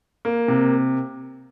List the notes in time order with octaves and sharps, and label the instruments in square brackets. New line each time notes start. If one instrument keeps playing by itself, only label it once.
[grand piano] A#3
C3